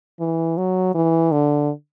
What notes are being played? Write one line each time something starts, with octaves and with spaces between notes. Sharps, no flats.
E3
F#3
E3
D3